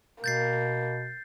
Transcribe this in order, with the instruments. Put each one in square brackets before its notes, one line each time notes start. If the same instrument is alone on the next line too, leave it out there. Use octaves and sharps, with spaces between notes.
[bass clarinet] B2 [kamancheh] A#3 [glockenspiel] G6 A6 C7